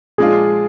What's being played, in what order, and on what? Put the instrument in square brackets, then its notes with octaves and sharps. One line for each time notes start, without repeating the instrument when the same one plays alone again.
[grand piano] A#2 F3 G#3 D4 F4 [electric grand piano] G#4